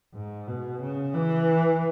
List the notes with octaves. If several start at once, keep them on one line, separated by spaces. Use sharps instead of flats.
G#2
B2
C#3
E3